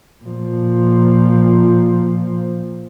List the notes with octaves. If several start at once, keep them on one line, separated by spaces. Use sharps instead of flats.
A#2 F3